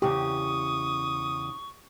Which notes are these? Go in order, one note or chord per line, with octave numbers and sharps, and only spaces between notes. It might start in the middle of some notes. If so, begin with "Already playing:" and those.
E2 C#3 G4 C#6 D#6